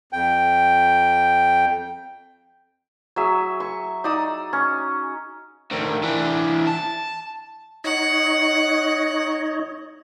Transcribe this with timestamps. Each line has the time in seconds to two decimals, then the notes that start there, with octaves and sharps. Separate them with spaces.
0.13 F2 G5
3.16 F#3 G#4 E5
3.60 C#6
4.04 D#4 D5 D#6 E6
4.53 C#4
5.71 D2 D#3
6.03 E3 D4
6.67 A5
7.84 D#4 C#5 D#5 F#5